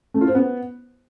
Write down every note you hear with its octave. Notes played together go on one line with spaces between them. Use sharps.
A3
F4
C5
B3